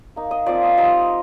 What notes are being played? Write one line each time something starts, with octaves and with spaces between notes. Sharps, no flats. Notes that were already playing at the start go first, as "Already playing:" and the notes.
A#3 D#4
D#5
F3 C4 F4 D5
D#5
G3 C4 D#4 D#5